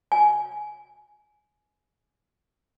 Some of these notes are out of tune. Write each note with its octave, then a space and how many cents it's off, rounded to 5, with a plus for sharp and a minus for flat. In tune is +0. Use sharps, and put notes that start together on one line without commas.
G#5 +15